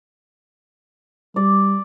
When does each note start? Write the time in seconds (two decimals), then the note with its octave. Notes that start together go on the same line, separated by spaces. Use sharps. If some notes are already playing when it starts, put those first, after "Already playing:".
1.36 G3 D5